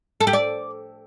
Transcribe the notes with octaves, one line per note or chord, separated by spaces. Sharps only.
A4
G4
D5